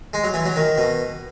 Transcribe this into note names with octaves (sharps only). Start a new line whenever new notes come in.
G#3
F#3
E3
F#3
D#3
B2